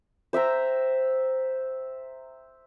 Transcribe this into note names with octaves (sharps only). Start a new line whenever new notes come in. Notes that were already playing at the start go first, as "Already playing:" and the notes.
C5 E5 G5 A#5